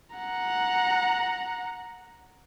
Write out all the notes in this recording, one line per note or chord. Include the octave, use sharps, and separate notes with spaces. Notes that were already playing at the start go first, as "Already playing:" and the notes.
F#5 A#5